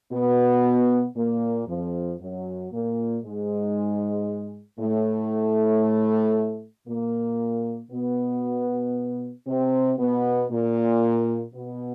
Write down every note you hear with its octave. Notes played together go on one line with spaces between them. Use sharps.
B2 B3
A#2 A#3
F2 F3
F#2 F#3
A#2 A#3
G#2 G#3
A2 A3
A#2 A#3
B2 B3
C3 C4
B2 B3
A#2 A#3
B2 B3